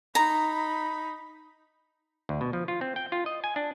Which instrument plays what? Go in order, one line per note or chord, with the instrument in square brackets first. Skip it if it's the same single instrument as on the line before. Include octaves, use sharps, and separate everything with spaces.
[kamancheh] D#4 B5 [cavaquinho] A#5
[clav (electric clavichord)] D2
B2
F3
F4
C4
G5
F4
D#5
G#5
D4